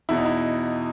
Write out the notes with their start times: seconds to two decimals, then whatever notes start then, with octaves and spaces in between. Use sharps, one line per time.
0.09 E2 B2 E4
0.17 D#4
0.25 E4